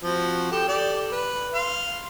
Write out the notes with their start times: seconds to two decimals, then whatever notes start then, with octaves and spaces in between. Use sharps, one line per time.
0.03 F3 C4 F#4
0.51 G4 A4 G5
0.68 G4 A4 D5
1.12 B4
1.54 F5 C6